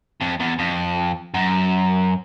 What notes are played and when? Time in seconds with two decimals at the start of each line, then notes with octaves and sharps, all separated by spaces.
0.21 F2
0.40 E2
0.59 F2
1.34 F#2